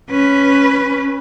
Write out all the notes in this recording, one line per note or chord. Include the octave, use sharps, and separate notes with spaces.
C#4 B4